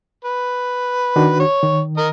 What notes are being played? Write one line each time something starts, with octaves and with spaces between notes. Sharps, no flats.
B4
D#3 D4 F#4
C#5
D#3
A#4 D#5